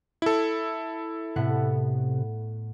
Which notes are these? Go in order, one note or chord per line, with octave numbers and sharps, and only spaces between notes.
E4 A4
A2 C3 B3 F#5